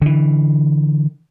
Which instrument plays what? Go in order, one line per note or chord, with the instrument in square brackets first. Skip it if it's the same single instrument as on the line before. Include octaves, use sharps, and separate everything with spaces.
[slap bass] D3 E3